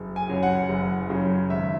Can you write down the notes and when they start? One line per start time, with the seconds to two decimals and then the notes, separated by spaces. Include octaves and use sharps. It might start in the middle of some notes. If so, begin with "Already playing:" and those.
Already playing: F#1
0.16 G#5
0.29 F#2 C#3 F#3
0.43 F#5
0.69 F#1
1.09 F#2 C#3 F#3
1.50 G#1 E5